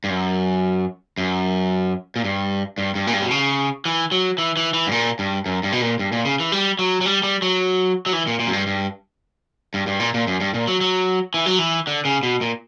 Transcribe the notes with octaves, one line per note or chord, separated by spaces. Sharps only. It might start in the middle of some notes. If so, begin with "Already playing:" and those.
G2
F#2
F#2
A#2
G2
G2
G2
A#2
G2
B2
C#3
E3
F#3
E3
E3
E3
G2
A#2
G2
F#2
G2
B2
A#2
G2
A#2
C#3
E3
G3
F#3
F#3
G3
G3
F#3
F#3
E3
A#2
A#2
F#2
G2
G2
G2
G2
A#2
A#2
F#2
G2
A#2
F#3
F#3
E3
F#3
E3
D3
C#3
B2
A#2